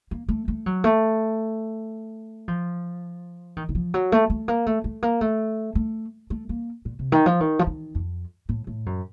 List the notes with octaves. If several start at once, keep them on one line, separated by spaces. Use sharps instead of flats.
A#3
A3
A3
F#3
A3
F3
D#3
D#3
F3
F#3
A3
A3
A#3
A3
A3
A#3
A3
A3
A3
A#3
A#2
C3
D#3
F3
D#3
F3
D#3
F2
A2
A2
F#2